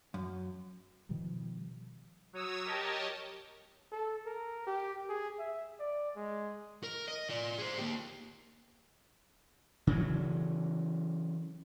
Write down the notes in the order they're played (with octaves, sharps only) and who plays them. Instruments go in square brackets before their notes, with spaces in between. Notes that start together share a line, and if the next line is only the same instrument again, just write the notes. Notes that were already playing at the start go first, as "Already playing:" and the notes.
[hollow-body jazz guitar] F#2
[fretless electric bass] B2 D#3 F3 G3
[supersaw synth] F#3 C#5 D#6 E6
G4 A#4 C#5 D#5 A5
[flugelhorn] A4
A#4
G4
G#4
E5
D5
G#3
[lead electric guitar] A#4
D#5
F4 D5
G#4 C5
A#3 G4
[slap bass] C#3 E3 F#3